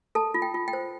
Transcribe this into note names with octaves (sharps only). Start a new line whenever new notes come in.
A4 A5
F4
G5
F4
G5
C5